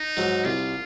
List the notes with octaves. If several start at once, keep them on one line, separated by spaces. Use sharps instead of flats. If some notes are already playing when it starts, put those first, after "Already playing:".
Already playing: D#4
G#2 F#3
C2 F4